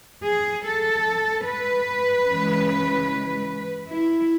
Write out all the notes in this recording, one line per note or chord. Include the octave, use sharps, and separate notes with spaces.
G#4
A4
B4
C#3 E3 G#3
E4